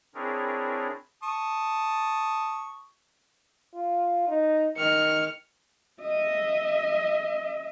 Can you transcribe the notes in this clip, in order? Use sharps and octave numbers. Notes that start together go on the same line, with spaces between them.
C4 D4 E4 G#4 A#4 C#5
A5 C#6 D#6
F4
D#4
D#3 F6 C#7
D#5 E5